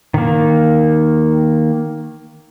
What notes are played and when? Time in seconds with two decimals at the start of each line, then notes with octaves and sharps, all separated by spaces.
0.14 D#3 A#3